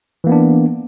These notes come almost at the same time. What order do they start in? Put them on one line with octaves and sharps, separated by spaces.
E3 A#3 B3 D4